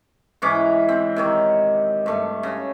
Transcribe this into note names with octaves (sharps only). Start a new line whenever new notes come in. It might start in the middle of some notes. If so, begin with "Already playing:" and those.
G#2 E3 C#4 D6
C4
C3 D#3 C#5
G2 A3
C#3